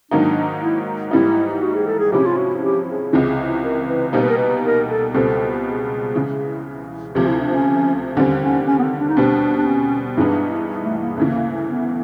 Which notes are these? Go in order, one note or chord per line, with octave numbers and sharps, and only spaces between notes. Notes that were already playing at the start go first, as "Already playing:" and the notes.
G#2 D#3 F#3 A#3 D4 D#4
E4
G#2 E3 G3 A#3 D#4 E4
F#4
G#4
A4
G#4
C3 F3 G#3 C#4 E4 G4
F4
F#4
G4
G#4
C#2 C3 E3
A#4
B4
B2 G3 A#3 D#4 C5
B4
A#4
B4
A#4
A4
C#2 B2 G3 C4 A4
G#4
C#3 E3 G#3
D2 C3 F3 G4
E4
D4
C#4
D#2 D3 G3 C4 C#4
C#4
C#4
B3
C4
D4
D#4
B2 G3 C4 D4
D4
C#4
G2 E3 G#3 B3 D4 D#4
A3
A#3
D2 C#3 E3 A#3
B3